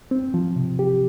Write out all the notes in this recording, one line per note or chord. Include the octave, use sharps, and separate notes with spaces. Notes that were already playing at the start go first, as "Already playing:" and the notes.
C4
F3
C3
G4